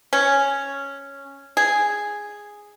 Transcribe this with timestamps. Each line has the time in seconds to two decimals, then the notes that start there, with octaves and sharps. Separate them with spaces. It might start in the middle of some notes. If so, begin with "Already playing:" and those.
0.13 C#4
1.57 G#4